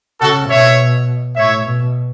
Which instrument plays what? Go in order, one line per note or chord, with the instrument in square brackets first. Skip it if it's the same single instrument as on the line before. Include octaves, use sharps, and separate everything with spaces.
[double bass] C#3 [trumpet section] F#4 A4
[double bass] B2 [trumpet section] C#5 E5
[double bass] A2 [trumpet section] C#5 E5
[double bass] B2